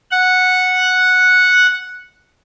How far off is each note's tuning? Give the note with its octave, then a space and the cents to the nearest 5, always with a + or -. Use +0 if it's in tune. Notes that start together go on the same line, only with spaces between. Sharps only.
F#5 -5